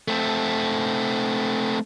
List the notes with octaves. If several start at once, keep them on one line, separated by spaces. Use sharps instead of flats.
A3 C4